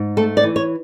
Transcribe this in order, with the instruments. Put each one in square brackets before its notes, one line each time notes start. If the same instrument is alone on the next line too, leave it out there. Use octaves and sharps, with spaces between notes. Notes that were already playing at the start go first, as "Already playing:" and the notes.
Already playing: [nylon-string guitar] G#2
A3 A4
D5
E3
C#5